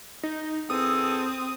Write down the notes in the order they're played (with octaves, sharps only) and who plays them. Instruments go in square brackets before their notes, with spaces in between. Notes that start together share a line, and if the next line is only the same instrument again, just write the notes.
[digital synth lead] D#4
[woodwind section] E2 G#4 A4 [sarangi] C4 [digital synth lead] D#6